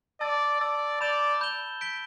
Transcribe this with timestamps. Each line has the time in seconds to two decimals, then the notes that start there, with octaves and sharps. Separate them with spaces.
0.21 D5 A5 E6 A6
0.61 D5 A5 E6 A6
1.00 D5 B5 G6 E7 G7
1.41 B5 G6 E7 G7
1.81 G6 B6 D7 G7